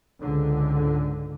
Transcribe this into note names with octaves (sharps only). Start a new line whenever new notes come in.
C#2 G#2 D3